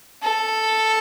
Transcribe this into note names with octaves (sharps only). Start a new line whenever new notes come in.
A4